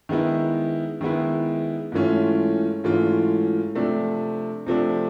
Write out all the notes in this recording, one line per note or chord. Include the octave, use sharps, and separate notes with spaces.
D#3 G#3 B3 E4
D#3 G#3 B3 E4
G#2 E3 A3 C#4 F4
G#2 E3 A3 C#4 F4
C3 F3 A3 D4
C3 F3 A3 D4